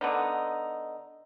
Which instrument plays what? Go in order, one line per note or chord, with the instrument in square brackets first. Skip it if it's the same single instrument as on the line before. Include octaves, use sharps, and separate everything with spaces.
[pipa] D3 B3 D#4